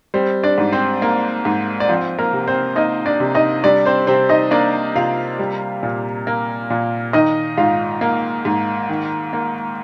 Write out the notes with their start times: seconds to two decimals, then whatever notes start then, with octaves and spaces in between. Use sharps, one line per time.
0.14 G3 C4 C5
0.43 D4 D5
0.58 G#2
0.72 C4 C5
1.02 A#3
1.45 G#2
1.80 D5
1.89 F3 C4 C5
2.19 A#3 A#4
2.33 C3
2.48 C4 C5
2.76 A#3 D#4 D#5
3.06 D4 D5
3.20 C3
3.35 D#4 D#5
3.64 G3 D4 D5
3.85 C4 C5
4.07 C3 C4 C5
4.29 D#4 D#5
4.51 A#3 D4 D5
4.95 C3 F4 F5
5.39 G3
5.83 A#2
6.27 A#3
6.70 A#2
7.13 D#3 D#4 D#5
7.57 G#2 F4 F5
8.01 A#3
8.45 G#2
8.89 D#3
9.33 A#3